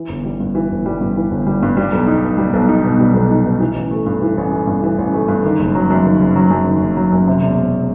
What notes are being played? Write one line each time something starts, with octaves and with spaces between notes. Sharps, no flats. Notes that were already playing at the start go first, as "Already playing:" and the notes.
Already playing: E3
G1
G3
G2
E3
G1
G3
G2
E3
G1
G3
G2
G3
B1
D#4
B2
G3
B1
D#4
B2
G3
B1
D#4
B2
E3
A1
A3
G2
E3
A1
A3
G2
E3
A1
A3
G2
D#3
F#1
F#3
F#2
D#3
F#1
F#3
F#2
D#3
F#1
F#3
F#2
C3
E1
E1